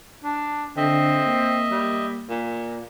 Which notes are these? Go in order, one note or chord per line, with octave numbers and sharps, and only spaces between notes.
D4
D3 C4 D#5 E5
A#3
G3
A#2